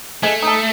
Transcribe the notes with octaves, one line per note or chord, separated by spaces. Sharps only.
G#3 A3
D#4 A4